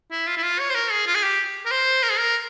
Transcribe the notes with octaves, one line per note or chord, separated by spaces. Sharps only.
E4
F4
E4
F4
C#5
C5
A#4
G#4
F4
G#4
G4
A#4
C5
A#4
G#4
A#4